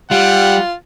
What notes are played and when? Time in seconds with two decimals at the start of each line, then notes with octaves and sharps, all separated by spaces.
0.11 G3 F4 F#5